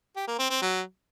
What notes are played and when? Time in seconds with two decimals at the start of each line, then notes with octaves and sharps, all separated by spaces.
0.16 G4
0.27 A#3
0.39 C4
0.50 C4
0.62 F#3